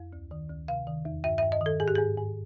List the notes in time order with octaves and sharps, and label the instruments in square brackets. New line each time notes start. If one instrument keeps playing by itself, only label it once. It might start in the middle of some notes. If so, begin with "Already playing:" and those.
Already playing: [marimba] F2
D2
D#3
D2
C3 F5
D#3
E2
G2 E5
G2 E5
D#5
D#3 A4
G#2 G#4
G4
G#2 G#4
G#2